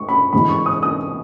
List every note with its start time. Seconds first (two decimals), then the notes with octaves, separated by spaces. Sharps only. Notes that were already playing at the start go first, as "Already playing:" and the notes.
Already playing: G#3 C#6
0.09 B5
0.33 G#2 E3 G#3 B5
0.49 C#6
0.66 D#6
0.83 D#6